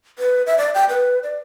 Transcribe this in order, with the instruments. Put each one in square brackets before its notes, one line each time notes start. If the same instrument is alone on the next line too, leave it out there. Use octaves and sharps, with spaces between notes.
[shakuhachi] B4
E5
D5
G5
B4
D5